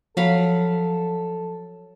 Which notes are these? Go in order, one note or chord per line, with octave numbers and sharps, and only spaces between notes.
F3 F#3 A4 F5 B5